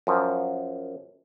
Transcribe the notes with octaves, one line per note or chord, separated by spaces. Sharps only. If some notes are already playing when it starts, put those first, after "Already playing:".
F#2 F3